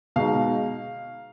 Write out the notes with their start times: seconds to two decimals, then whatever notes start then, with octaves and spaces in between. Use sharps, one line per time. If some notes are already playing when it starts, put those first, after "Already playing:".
0.16 B2 G#3 D#4 F5